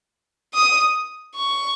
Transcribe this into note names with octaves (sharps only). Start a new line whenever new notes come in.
D#6
C#6